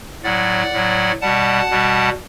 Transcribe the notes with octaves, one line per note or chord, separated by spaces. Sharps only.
A2 F#3 D5 F#5
A2 F#3
B2 G3 F#5 A5
B2 G3